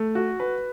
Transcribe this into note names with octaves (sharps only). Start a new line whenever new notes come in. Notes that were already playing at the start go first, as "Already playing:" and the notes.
Already playing: A3
F#4
B4